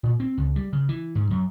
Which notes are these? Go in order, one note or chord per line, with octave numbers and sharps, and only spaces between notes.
A#2
C4
C#2
G3
C#3
E3
G#2
F#2